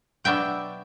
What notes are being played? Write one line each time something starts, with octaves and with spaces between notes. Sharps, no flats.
B2 F#3 B3 D4 E5 G5